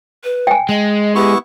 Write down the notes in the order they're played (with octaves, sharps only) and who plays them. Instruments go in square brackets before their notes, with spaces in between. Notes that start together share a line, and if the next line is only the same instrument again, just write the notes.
[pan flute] B4
[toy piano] G5 G#5
[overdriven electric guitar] G#3 [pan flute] D#5
[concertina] B3 E4 C#6 [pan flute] G4